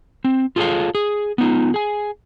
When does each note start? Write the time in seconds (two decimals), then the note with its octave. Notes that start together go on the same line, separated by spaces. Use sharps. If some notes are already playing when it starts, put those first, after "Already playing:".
0.24 C4
0.56 F4 G#4 A4 B4 C#5 F5
0.95 G#4
1.38 B3 D#4 F4
1.74 G#4 G#5